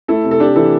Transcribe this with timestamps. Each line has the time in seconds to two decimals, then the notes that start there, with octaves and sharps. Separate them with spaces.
0.08 A3 E4 A4
0.24 C3
0.31 A4
0.40 C3 D4 G4
0.56 E3 E4 A4